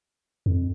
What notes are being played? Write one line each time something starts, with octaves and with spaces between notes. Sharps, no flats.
F2